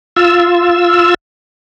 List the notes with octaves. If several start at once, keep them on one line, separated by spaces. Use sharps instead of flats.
F4 E6